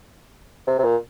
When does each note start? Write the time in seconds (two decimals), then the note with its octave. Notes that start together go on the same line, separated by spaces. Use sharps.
0.67 C3
0.79 C3
0.84 A#2